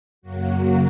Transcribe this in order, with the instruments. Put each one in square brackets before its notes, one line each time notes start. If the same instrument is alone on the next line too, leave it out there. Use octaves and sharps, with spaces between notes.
[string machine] F#2 C#3 F#3 A#3 F#4